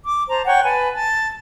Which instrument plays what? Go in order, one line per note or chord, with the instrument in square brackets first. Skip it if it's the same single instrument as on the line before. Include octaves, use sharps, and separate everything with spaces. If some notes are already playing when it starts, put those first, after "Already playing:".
[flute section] D6
C5 A5 A#5
C#5 F#5 G5 C#6
B4 G#5 A5
A5